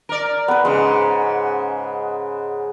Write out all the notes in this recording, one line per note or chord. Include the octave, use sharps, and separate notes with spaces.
A#4 D5
B3 B4
G#2 C#3 G#3